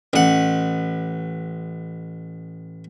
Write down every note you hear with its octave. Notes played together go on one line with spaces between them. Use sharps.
A1 F#5